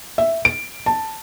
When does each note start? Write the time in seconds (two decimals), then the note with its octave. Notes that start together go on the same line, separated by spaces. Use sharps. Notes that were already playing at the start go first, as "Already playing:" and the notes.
0.18 E5
0.45 D7
0.86 A5